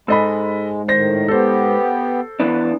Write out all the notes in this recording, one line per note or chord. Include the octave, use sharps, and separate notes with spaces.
G#2 G#3 A4 D#5 B5
A2 D#3 C5 A#6
B3 G4 A4 C5
E3 B3 D4